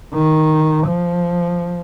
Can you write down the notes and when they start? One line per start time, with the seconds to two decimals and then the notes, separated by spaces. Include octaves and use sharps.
0.14 D#3
0.88 F3